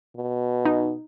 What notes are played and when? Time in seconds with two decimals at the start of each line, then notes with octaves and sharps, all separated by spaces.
0.16 B2
0.65 D#4